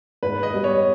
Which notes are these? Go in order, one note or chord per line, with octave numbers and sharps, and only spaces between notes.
G#2 B4
D#5
G3 B3
C#5